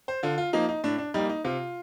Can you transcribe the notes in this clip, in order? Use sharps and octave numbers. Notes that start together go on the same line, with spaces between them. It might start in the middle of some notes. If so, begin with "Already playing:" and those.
C5
D3 F4
F4
F3 A#3 D#4
D#4
A2 D4
D4
G3 A#3 D#4
D#4
C3 F4